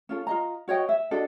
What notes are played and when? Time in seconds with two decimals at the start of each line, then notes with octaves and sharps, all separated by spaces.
0.09 C#4 F4 A4
0.27 F4 D#5 A#5
0.68 F#4 C#5 D#5 G5
0.89 E5
1.11 D4 F#4 A4 D#5